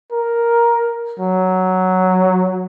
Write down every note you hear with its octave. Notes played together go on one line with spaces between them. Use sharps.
A#4
F#3